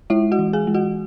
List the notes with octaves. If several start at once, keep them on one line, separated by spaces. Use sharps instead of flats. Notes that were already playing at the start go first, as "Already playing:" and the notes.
G#3 E4 E5
F#4 F#5
E3
G#4 G#5
G#3
F#4 F#5